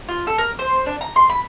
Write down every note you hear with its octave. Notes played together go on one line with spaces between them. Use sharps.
F4
A4
A#4
C5
D4
A#5
C6
B5